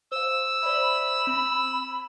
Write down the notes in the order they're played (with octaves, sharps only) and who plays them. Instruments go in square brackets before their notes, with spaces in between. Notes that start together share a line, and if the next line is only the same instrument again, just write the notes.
[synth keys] C5 F5 [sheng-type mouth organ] E6
[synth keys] C5 D5 E5 [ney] B5
[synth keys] C4